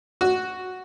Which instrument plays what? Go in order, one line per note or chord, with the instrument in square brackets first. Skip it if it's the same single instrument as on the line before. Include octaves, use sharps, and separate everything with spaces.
[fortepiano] F#4